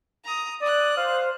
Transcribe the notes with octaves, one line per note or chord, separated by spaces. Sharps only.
A#5 D#6
D5 D#6 F#6
C5 F5